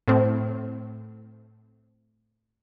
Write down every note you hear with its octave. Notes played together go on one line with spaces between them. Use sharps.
A2 C4